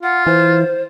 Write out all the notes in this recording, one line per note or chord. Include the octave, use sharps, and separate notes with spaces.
F4 F#5
E3 C5